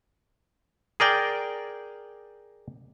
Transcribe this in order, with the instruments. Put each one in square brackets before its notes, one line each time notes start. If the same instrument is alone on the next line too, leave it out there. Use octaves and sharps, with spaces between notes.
[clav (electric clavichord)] G#4 A#4 D5 G5